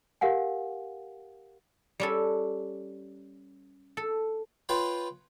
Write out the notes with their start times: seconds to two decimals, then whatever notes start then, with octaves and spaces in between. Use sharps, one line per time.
0.21 G4 A#4 F5 F#5 G#5
2.00 G3 C#4 A4
3.97 A4
4.69 F4 B4 C#5 G5 C6